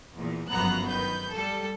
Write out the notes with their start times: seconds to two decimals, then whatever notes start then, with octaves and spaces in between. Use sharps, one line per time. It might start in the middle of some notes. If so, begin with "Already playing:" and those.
0.18 E2 A#2
0.49 G1 F#2 F3 B3 A#5 F#6
0.88 D#3 B4 G6
1.32 G3 A4